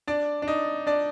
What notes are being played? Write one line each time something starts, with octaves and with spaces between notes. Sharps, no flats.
D4 D5
D4
D#4
D4 D5